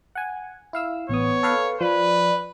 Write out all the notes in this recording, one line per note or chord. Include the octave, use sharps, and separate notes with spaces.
F#5 G#5
E4 F5 E6
A1 B3 C#5 D#6
A4 B4 F5
F3 B4 D5